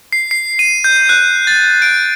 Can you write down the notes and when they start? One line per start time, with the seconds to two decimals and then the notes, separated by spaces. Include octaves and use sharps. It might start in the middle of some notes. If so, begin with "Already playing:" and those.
0.13 C7
0.31 C7
0.59 D#7
0.84 G6
1.09 F#6
1.47 A6
1.82 D7